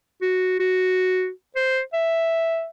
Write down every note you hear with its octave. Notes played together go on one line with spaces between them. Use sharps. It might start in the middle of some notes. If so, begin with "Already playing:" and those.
F#4
F#4
C5
E5